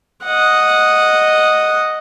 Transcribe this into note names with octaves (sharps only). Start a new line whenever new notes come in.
D#5 F#5